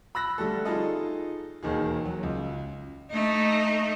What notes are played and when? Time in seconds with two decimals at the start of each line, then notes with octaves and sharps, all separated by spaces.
0.15 B5 E6 F#6 A#6
0.38 D3 G3 A3 A4
0.65 D#4 F4 G#4 A4 D#5
1.63 E1 D#2 D#3 G#4
2.05 F#3
2.23 C#2
3.11 A3 D#4